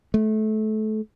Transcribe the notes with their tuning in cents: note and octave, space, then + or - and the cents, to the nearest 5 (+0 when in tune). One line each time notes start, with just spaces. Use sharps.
A3 -25